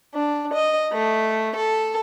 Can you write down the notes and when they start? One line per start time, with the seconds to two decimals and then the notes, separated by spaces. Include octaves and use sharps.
0.15 D4
0.53 D#5
0.92 A3
1.56 A4